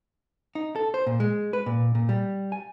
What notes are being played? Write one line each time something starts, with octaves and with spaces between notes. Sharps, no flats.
D#4
A4
C5
A#2
G#3
B4
A#2
A#2
G3
G#5